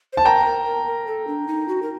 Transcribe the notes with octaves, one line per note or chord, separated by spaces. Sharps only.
C5 A5
A#4 G5 A#5
A#4
A#4
A#4
A4
D4
D#4
F#4
A#4